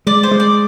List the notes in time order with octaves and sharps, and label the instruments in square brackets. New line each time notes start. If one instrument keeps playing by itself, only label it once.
[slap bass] G#3 [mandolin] D5
[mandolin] C5
[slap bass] G#3
[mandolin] D5